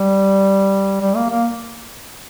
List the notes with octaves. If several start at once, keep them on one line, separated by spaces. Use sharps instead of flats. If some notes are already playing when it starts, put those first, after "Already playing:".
Already playing: G3
G3
A#3
A#3